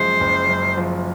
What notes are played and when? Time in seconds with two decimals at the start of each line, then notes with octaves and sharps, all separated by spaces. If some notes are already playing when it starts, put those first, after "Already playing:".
Already playing: F#1 F#2 F3 G#3 C5
0.20 F#1
0.48 F#2
0.77 F3